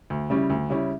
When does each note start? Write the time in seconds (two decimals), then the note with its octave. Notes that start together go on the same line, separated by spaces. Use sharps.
0.10 D2
0.30 C#3 G3 C#4 E4
0.50 D2
0.70 C#3 G3 C#4 E4